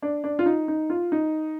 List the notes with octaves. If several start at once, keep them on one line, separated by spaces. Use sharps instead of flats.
D4
D4
F4
D#4
D#4
F4
D#4